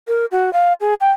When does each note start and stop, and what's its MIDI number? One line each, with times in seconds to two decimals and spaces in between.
0.08 0.26 70
0.32 0.52 66
0.53 0.73 77
0.81 0.94 68
1.01 1.12 79